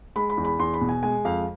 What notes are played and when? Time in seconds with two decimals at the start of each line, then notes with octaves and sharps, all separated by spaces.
0.16 G#3 B5
0.30 B5
0.37 E2
0.45 B5
0.59 E2 C6
0.74 B5
0.81 B2
0.89 G#5
1.03 G#3 G#5
1.25 F2 F5